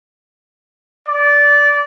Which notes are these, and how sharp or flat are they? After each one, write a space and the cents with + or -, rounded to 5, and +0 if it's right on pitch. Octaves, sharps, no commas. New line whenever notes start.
D5 -15